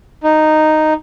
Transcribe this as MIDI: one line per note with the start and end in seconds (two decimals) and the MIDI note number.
0.24 0.93 63